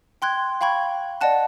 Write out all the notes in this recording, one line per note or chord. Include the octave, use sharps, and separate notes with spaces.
G5 C6 F#6 G#6
F5 G5 B5 C#6 G#6
D5 D#5 F#5 A5 F#6